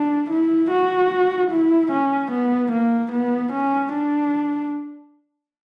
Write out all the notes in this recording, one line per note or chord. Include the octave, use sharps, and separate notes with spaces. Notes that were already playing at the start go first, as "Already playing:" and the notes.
Already playing: D4
E4
F#4
E4
C#4
B3
A#3
B3
C#4
D4